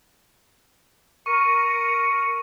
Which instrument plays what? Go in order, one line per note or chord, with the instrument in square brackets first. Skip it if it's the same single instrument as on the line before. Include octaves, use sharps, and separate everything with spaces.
[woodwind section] A#4 [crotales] C#6 D#7 [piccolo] C#7